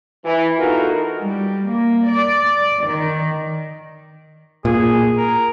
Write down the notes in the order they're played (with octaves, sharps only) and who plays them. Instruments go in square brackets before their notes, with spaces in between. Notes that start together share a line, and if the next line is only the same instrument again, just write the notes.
[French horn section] E3
B3 D#4 F4 F#4 A4 A#4
[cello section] G3
A#3
D5
D#3
[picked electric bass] A#2 [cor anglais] G#4
[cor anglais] A#4